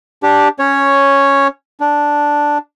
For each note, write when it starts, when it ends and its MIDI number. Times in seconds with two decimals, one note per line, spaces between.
0.23 0.48 62
0.23 0.48 67
0.59 1.48 61
0.59 1.48 73
1.81 2.58 62